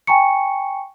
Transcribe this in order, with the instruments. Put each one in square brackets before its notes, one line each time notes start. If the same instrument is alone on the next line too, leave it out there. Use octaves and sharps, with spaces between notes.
[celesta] G5 G#5 A#5 C#6 C#7